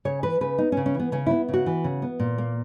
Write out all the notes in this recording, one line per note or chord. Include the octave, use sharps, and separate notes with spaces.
C#3 C#5
E3 B4
C#3 B4
B3 D#4
C#4
C#3
C#4
E3
B3
C#3 C#4
B3 E4
C#3
F#4
E3
C#3
B3
A#2
A#3